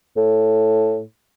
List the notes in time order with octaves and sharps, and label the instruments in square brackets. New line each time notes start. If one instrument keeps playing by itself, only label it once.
[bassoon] A2